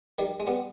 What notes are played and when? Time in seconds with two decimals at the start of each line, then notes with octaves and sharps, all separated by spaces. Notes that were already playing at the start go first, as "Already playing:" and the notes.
0.18 D#3 G3
0.40 G#3
0.47 G3 B3